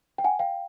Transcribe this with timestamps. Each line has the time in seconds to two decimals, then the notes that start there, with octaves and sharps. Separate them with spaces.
0.18 G5
0.24 F#5 G#5
0.39 F5 G5